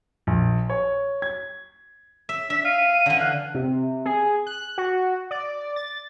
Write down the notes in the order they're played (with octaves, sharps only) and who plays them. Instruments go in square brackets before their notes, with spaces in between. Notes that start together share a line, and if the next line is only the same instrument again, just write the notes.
[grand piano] A#1
C#5
G#6
[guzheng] E5
[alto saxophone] D4 [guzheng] E5 [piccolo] B6
[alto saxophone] F5 [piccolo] D#7
[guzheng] D3 E3
[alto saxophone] F5 [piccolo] F#6
[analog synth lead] C3
G#4
F#6
F#4
D5
A6